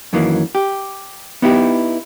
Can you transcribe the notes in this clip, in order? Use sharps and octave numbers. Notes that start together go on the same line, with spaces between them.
F#2 D#3 E3 F#3 A#3
G4
B3 D#4 E4 F#4 G4